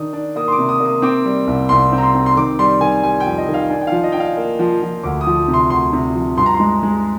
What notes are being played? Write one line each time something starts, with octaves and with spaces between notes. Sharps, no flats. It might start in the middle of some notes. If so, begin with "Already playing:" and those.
Already playing: D#3 D4 D#6
D4
A#3 D#6
C6
D6
C3
D#6
A#3
D#6
C4 D6
G3
C2
C2 C6
C4
A#5
C6
C4
C6
D#3 D6
G3 C6
D#3 G#5
G3 G#5
G5
F2
D#5
D#3
F5
D4 G#5
G5
F3 F5
D#5
D4 G5
F5
A#3
F3
F3
D2 D6
D#6
F3
C3
C6
D2 C6
C3
F3
G2 C6
A#5
C6
G#3
G#3